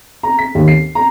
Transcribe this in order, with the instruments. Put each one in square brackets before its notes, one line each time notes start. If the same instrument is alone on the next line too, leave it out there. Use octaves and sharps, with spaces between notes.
[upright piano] A#5
B6
D#2
C7
A#5